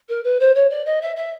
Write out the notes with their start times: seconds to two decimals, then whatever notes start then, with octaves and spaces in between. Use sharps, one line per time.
0.08 A#4
0.24 B4
0.40 C5
0.55 C#5
0.69 D5
0.85 D#5
1.01 E5
1.16 E5